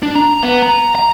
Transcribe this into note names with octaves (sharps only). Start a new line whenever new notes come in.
D4
A#5
B3
A#5
A#5